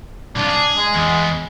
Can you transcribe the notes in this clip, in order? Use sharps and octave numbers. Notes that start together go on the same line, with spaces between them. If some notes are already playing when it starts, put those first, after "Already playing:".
C2 D4 F4
G#4
G#3
E2